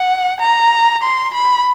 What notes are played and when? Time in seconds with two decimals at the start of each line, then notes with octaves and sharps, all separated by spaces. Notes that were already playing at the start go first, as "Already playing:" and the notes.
Already playing: F#5
0.40 A#5
1.03 C6
1.34 B5